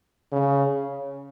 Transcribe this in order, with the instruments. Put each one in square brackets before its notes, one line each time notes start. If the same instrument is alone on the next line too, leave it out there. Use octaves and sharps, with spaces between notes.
[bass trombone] C#3